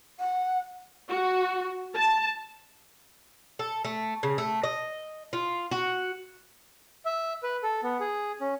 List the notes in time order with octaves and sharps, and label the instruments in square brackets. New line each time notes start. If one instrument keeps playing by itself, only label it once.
[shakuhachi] F#5
[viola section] F#4
A5
[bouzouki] A4
A3
C#3
A3
D#5
F4
F#4
[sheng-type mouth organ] E5
B4
A4
B3
G#4
C#4